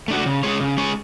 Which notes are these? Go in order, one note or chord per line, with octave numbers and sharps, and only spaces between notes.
A3 D4 F#4
C#3
G#3 C#4 G#4 C#5
C#3
G#3 C#4 G#4 C#5